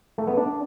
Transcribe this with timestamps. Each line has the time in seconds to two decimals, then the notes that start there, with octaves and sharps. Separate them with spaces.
0.18 A3
0.27 B3
0.37 D4